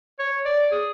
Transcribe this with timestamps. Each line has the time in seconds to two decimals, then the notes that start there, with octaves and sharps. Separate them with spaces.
0.19 C#5
0.45 D5
0.71 G#4